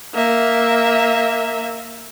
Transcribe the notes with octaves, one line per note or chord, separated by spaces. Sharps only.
A#3 E5